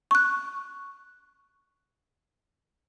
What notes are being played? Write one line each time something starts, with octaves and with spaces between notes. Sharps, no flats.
C#6 F#6